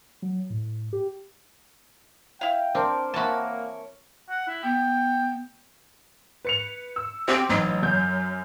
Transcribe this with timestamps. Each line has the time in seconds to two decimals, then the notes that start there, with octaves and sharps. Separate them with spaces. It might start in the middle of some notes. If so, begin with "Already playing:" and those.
0.22 F#3
0.50 A2
0.93 G4
2.41 E4 F5 G5
2.75 C4 D4 A#4 C5
3.14 E3 A#3 F#4 C#5 A5 B5
4.30 F#5
4.48 E4
4.63 B3 G5
6.45 B4 C#7 F7
6.96 E6
7.28 C4 G4 C5
7.49 A1 F#3 D#4
7.83 F#2 G6